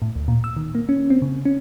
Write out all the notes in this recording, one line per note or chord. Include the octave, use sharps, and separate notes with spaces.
A2
D2
A#2
E6
D#3
A#3
C#4
C4
C#3
C#4